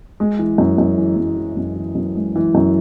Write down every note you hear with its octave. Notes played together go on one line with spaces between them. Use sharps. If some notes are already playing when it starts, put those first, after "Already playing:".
G#3
E3
F#2
F#2
E3
F#2
E3
F#2
E3
F#2
G#3
E3
F#2